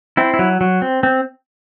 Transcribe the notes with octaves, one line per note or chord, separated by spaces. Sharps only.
C4 E4
E4
F#3
F#3
C4
C4